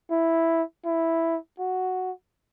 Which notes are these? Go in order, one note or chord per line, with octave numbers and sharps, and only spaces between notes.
E4
E4
F#4